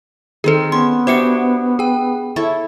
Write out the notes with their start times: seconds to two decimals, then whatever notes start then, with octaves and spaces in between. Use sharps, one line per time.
0.44 D#3 C4 G#4 A4
0.72 B3 C#4 C6
1.07 D4 F#4 G4 C5 E5 C#7
1.79 G#4 G5
2.36 E4 A4 C#5